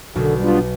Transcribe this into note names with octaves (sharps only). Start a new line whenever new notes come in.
B1 B2 D3
G3 B3 D4 F4